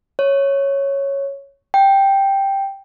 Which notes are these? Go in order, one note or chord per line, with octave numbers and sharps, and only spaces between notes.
C#5
G5